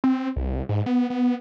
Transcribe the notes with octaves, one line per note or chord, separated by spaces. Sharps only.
C4
C2
G#2
B3
B3